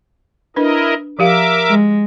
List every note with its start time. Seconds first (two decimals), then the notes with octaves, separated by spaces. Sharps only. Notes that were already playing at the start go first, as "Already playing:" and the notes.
0.56 D4 E4 A#4 B4 D#5
1.19 F3 G4 A#4 E5 F5 D6
1.68 G#3